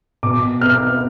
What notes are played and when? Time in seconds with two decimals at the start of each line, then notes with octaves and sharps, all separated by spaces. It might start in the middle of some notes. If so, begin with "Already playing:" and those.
0.23 B2 D6
0.61 B3 F6